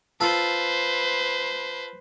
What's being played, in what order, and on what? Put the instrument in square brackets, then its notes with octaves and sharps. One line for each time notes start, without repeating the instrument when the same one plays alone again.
[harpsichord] F4 A4 [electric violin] B4 C5